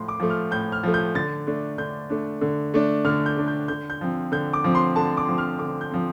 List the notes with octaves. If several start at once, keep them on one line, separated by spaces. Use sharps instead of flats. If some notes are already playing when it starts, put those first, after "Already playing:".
Already playing: A2 F3 A3 C6
D6
F3 A3
F6
A2 G6
F6
F3 A3
G6
D3 A6
A3 D4
D3 G6
A3 D4
D3
A3 D4
D3 F6
G6
A3 D4
G6
D3 G6
G6
F3 C4
D3 G6
D6
F3 C4
C6
D3 A5
D6
F3 C4
F6
D3 D6
G6
F3 C4